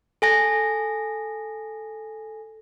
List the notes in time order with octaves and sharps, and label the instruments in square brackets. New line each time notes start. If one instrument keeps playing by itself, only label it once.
[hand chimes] A4 G#5 A#6